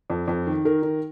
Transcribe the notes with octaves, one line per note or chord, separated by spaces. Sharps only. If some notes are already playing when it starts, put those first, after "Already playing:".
F2
F2
D#3
D#3 A#4
D#3